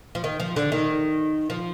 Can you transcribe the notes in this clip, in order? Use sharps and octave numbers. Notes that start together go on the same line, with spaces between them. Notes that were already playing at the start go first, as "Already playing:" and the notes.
F3
D#3
F3
D3
D#3
F3